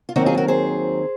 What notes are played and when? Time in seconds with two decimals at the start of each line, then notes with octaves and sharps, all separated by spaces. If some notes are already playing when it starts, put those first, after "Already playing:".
0.09 F4
0.16 D#2 D#3 F#3 C4 D#4 F#4
0.26 F4 G#4
0.37 F#4 A#4
0.48 G#4 C5